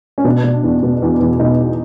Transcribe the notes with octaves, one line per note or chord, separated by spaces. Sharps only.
C#4
B2 D4
B2
E2
B2
E2
E2
B2 D#4